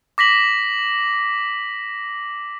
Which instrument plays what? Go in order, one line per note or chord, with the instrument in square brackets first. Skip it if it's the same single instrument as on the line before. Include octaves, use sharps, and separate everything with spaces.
[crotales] D6 A#6 B6 F#7